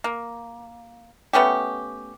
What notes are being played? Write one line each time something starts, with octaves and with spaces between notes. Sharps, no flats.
A#3
A3 B3 C#4 G4